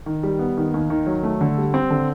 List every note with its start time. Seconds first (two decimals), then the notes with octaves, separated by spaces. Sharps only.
0.06 D#3
0.23 G3
0.39 B3
0.57 D#3
0.74 D#2
0.90 D#3
1.07 F#3
1.23 A3
1.41 D3
1.58 G3
1.74 C4
1.90 D3